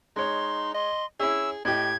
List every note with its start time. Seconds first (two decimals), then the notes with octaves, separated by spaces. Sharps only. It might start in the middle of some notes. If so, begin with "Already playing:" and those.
0.16 G#3 D#4 C#5 C6
0.75 D#5 C6
1.20 C#4 E4 G#4 E6
1.65 A2 G4 D#5 G#6